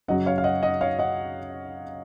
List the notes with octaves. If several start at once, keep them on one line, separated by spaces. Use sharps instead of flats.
F#2 C#3 F#3 D#5 F#5
C#5 F5
F5
D#5 F#5
D#5 F#5
C#5 F5
D#5 F#5